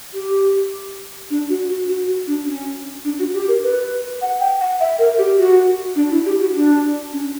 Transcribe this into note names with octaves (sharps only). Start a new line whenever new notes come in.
G4
D4
F#4
F#4
F#4
F#4
D4
C#4
D4
F#4
G4
A#4
B4
F#5
G5
F#5
E5
A#4
G4
F#4
D4
E4
G4
F#4
D4
C#4